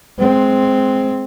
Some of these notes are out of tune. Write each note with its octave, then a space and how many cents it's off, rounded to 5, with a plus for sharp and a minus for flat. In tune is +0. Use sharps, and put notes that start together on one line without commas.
G#3 +20 C4 +0